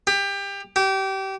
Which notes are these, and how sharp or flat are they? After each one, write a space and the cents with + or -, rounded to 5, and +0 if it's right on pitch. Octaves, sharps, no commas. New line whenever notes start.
G4 +25
G4 -25